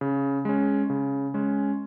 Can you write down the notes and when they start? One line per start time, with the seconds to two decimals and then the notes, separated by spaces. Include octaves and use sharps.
0.01 C#3
0.45 G#3 C#4
0.90 C#3
1.34 G#3 C#4